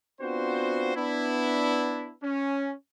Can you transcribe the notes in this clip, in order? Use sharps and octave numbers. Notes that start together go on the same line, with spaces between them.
B3 C4 D4 F4 F#4 C5
B3 D4 E4
C#4